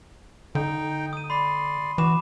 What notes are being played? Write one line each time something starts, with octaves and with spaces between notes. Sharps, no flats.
D3 D#4 G5
D#6 D#7
D5 B5 C6
E3 F#4 B5 D6 E7